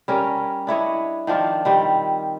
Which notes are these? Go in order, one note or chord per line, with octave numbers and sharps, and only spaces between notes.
G3 C#4 A#4
D4 E4 C#5 D#5
D#3 F3 D4 F4
D#3 G3 C4